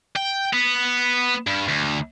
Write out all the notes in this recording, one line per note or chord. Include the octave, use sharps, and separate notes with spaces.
G5
B3
G2
D2